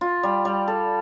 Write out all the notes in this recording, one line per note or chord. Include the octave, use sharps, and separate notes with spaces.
F4
G3
G3
A4